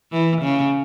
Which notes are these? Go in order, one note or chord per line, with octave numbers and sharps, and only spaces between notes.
E3
C#3